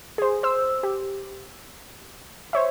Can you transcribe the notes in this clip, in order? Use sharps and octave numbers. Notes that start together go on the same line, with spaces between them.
G#4 C5
C5 E6
G4
C5 C#5 E5